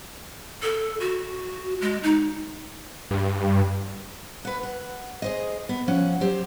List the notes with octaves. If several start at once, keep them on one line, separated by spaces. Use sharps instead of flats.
A4
F#4
G#3
D#4
G2
B4 F#5
F#5
G#4 C5 D#5
B3
F3 C#4 F#5
F#3 G4 C5